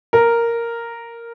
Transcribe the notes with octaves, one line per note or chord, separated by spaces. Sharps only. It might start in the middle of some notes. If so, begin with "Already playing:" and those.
A#4